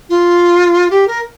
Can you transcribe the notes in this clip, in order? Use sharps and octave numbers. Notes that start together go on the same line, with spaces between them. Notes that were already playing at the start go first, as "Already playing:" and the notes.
F4
G4
A#4